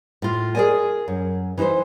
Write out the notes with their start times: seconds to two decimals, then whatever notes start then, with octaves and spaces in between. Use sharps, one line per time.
0.22 A2 F4
0.55 G#4 A#4 C5 D5 D#5 G#5
1.08 F#2
1.58 E3 D#4 G4 B4 C5